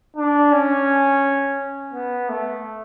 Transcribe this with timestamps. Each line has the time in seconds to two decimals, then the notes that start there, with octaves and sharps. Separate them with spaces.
0.16 D4
0.53 C#4
1.94 B3
2.29 A3